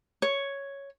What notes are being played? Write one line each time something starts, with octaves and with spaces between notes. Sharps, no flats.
C#5